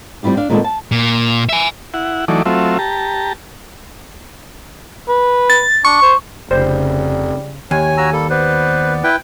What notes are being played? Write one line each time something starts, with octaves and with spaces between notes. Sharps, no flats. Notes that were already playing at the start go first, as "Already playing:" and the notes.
G3 C4 E4 F4 G4
D4 F5
A#2 D#3 G#3 B3 C4 A4
A5
A#2
E5 G#5
E4 F#5
E3 F#3 A3 D#4 D5
F#3 A3 C4 F4 E5
G4 A5 A#5
B4
A6
D4 C#6
C5
F1 C#3 G3 C5
D#2 C#5 G#5
F#4 A#5 E6
G3 A#3 A4
B3 B4 C5 D5
E4 B4 G5